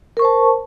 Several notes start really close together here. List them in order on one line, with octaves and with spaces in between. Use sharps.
A#4 C#6 C5 A5